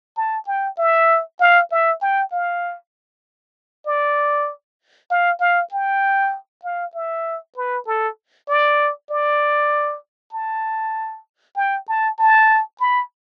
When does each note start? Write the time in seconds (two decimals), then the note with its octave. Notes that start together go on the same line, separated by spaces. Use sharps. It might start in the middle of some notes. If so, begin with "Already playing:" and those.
0.17 A5
0.47 G5
0.78 E5
1.40 F5
1.72 E5
2.02 G5
2.32 F5
3.86 D5
5.11 F5
5.40 F5
5.72 G5
6.64 F5
6.94 E5
7.57 B4
7.87 A4
8.49 D5
9.10 D5
10.33 A5
11.56 G5
11.88 A5
12.19 A5
12.80 B5